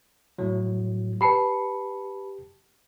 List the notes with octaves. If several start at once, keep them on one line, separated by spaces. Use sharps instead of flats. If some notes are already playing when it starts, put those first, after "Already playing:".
A2 F#3
G4 B4 A5 B5 C7 C#7